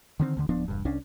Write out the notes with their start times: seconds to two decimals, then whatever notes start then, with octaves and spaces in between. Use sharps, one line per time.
0.20 D3 D#3 C4
0.37 D2 D3
0.49 D1 F3 B3 D4
0.68 E1 G2
0.85 C2 C#4 D4